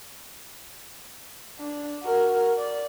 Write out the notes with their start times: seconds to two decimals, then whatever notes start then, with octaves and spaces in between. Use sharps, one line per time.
1.59 D4
2.03 F#4 A#4
2.57 D5